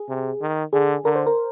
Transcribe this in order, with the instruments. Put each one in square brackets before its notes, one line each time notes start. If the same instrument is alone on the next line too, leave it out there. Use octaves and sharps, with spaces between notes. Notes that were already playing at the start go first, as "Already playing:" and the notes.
Already playing: [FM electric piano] G#4
[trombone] C3
D#3
[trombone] D3 [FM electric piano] G#4
[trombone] D3 [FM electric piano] A#4
[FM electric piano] C5
A#4